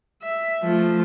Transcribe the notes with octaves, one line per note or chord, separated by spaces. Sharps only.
E5
F3 A3